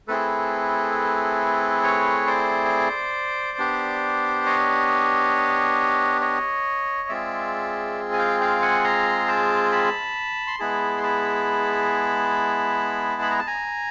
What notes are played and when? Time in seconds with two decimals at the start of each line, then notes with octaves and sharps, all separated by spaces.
0.08 A3 C4 E4 G#4 A4 B4
1.83 B4 C#5
2.27 C5 D5
3.58 B3 D4 G4
4.46 C#5 D#5
6.21 C#5 D#5
7.09 G#3 C4 F4 G#4 D5 E5
8.13 G#5
8.19 F5 G5
8.40 F5 G5
8.62 F#5 G#5
8.84 A#5 C6
9.28 G5 A5
9.72 A5 B5
10.47 C6
10.59 G#3 B3 E4 G#4 A5 B5
10.98 C6
11.03 A5 B5
13.22 B5
13.31 A#5
13.39 A5
13.47 G#5 A#5